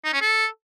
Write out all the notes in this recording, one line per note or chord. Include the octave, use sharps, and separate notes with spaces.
D#4
C#4
A4